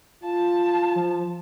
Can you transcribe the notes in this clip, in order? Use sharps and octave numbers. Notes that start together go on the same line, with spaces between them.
F4 A5
F3